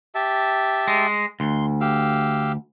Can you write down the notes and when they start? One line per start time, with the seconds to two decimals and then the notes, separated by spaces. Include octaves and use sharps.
0.15 G4 E5 A5
0.88 G#3
1.40 D2 C6
1.81 G4 F5 E6